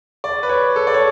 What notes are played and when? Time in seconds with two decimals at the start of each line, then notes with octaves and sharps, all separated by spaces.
0.24 D5
0.43 B4
0.49 C#5
0.76 A4
0.87 D5
0.94 C#5